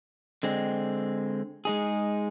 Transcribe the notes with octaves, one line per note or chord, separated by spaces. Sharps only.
D3 G#3 C4
G#3 D#4 G#4